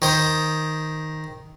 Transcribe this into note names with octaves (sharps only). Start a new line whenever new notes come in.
D#3 C5 D#6